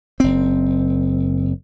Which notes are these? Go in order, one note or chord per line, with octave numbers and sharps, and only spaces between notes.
F#1 C4